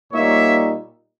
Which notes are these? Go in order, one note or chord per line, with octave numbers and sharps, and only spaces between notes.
A#2 G3 A#3 D#4 C#5 E5